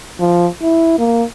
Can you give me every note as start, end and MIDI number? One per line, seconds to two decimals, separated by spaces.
0.20 0.47 53
0.62 0.95 64
0.99 1.24 58